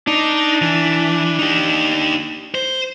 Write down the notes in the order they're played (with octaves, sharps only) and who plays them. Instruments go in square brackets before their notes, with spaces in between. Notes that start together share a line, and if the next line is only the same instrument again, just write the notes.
[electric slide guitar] D4 [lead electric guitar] D#4
[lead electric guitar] E3
D#4 G4
C5